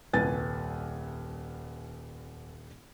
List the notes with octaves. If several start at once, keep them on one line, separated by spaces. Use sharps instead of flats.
D#1 C2 B4 G#5 A6